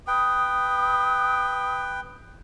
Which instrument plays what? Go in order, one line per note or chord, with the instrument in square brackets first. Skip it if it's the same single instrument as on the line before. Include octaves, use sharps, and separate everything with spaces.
[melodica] B4 G5 [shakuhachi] D#6